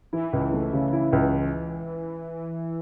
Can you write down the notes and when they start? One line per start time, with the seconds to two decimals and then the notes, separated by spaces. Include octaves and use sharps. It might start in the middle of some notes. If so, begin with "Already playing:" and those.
0.13 E3 E4
0.33 C#2
0.53 A3
0.73 C#3
0.93 E4
1.13 C#2